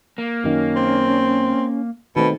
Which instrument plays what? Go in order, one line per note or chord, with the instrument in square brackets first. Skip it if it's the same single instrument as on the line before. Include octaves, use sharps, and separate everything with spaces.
[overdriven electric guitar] A#3
[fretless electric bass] F#2 D#3 [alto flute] C#4
[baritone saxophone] C4
[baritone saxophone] B2 [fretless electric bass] D#3 A3 C4